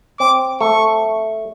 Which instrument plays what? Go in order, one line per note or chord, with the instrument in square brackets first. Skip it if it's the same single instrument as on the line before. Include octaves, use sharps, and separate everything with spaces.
[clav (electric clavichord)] C4 [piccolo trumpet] D6
[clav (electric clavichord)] A3 [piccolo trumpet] C#6